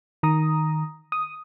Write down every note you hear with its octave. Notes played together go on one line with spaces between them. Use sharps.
D#3 A#5 D#6
D#6